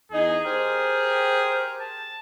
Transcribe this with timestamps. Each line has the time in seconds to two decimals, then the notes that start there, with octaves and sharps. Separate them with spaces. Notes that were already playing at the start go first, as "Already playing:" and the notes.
0.12 E2 D#4 G#4
0.45 G4 A#4 C5
1.81 A5